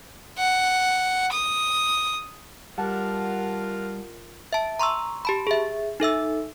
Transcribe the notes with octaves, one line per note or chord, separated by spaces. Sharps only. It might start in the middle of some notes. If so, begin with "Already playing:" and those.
F#5
D#6
G3 F4 A#4 F#5 A5 F#6
E5 A5
A#5 C6 C#6 E6
G4 A5 B5
G#4 E5
D#4 A4 E5 E6